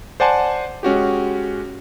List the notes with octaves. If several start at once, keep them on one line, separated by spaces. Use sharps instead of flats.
C5 D5 F#5 G#5 A5 C6
G#3 C#4 F#4 G4